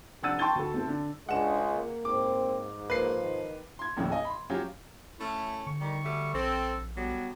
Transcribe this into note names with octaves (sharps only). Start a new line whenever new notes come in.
F1 D4 F#5 E6 A6 D#7
G5 A5 C6 C#6 A6 G7
D2 A4
A3 C4 A4
D3
C#2 G#3 D4 F#5 E7
A#3
G#2 C4 D6
F3 A#3 B4 C7
D#3
C6 G#6
A#1 D#2 A2 C#3
D#5 G#5
B5 C6
F#3 C#4 F4 G4
A3 C#4 E4
D3 C#6
D#3 G3
F#3 G3 A3
A#1 C4 A4
D3 F#3 G3 B3